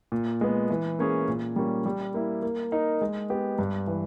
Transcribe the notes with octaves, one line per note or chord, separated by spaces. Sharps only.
A#2
G#3 B3
E3
A#3 C#4 G#4
A#2
G3 A#3 C#4
G3
A#3 E4
A#3
D#4 A#4
G#3
B3 G4
G2
E3